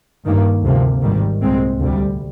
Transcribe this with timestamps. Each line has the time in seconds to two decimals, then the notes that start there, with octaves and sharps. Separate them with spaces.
0.25 G2 D#3 A#3
0.64 D2 C3 F3 A#3
1.03 G#1 G#2 D#3 G3
1.42 C2 A#2 G#3 C4
1.80 D2 C3 G3